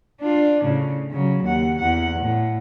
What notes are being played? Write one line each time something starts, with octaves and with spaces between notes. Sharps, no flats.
D4 F4
A2 C#3
C#3 F#3
D#2 F#5
E2 F#5
A2